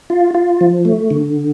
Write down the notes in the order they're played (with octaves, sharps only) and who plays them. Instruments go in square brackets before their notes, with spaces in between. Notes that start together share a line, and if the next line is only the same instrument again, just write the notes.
[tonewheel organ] F4
F4
F3
A3
D3